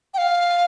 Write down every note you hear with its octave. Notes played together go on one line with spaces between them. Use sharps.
G5
F5